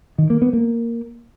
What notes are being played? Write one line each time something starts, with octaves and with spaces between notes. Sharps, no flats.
D#3
A#3
B3
A#3